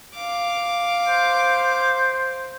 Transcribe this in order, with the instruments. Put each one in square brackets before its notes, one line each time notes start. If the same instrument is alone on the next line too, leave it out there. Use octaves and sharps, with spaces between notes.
[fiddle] F5 D6
[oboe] C5